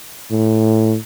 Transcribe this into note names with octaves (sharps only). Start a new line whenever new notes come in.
A2